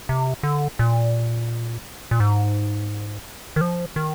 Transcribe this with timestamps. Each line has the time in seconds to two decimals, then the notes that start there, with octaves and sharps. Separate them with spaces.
0.09 C3
0.43 D3
0.79 A#2
2.11 A#2
2.20 G#2
3.56 D#3
3.61 F3
3.96 D#3